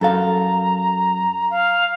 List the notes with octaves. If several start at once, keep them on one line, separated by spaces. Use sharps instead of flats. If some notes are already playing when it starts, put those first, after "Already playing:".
F#2 A4 F5 A#5
F5